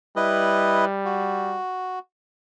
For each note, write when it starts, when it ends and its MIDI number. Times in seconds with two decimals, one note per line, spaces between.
0.16 1.58 55
0.16 0.85 64
0.16 0.85 71
0.16 0.85 75
1.05 1.99 66